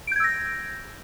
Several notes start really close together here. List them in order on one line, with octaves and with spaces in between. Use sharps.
D7 G6 G#6 E6 A#6